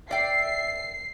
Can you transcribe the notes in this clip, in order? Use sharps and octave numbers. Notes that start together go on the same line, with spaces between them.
D5 E5 G5 C7